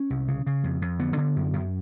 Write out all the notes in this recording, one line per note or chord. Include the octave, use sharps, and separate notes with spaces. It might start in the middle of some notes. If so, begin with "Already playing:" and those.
Already playing: C#4
C2
C#3
C#3
F2
F2
D3 B3
D3
F#2
F#2